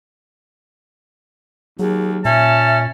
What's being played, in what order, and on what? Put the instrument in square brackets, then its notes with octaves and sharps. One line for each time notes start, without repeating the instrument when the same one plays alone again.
[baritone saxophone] D#2 [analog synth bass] F#3 [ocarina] G#4
[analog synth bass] A#2 [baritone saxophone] C#4 [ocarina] E5 [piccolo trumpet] A5